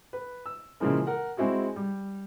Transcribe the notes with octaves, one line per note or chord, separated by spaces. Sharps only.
B4
E6
A#2 C#3 E3 F3 G#3 A#3
A#4 F#5
G#3 C4 E4 F#4 G#4
G3